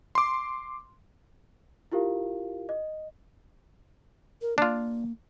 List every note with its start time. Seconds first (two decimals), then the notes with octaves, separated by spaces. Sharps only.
0.15 C6 D6
1.92 E4 F4 G4 A#4 F5
2.69 D#5
4.42 A#4
4.58 A#3 D4 F4